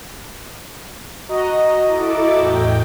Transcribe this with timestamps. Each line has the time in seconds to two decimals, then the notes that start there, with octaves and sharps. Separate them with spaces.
1.29 F#4 D#5 A#5
1.84 E4 A4 D6
2.34 E2 A2 G5